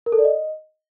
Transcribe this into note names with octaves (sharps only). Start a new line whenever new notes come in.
A#4
A4
D5
D#5